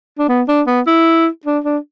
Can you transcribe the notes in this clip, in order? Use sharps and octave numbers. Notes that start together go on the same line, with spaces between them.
D4
B3
D4
B3
E4
D4
D4